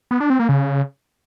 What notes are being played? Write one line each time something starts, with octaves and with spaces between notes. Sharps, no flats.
B3
D4
C4
A#3
C#3